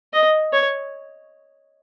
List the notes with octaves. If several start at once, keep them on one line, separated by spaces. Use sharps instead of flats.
D#5
C#5